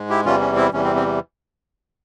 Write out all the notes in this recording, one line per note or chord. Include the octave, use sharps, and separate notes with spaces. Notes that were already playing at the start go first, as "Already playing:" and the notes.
Already playing: G#2 G#3
E4 G4
E2 C3 E3 G3 C#4 F4
C#4
C4 E4
E2 C3 E3 G3 C#4
C4
C4